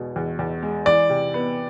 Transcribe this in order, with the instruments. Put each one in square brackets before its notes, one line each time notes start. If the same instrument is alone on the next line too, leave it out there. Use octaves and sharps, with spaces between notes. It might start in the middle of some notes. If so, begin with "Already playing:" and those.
Already playing: [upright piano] E2 B2 G#3
E2
E2
G#3
[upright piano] E3 [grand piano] D5
[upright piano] C3
B3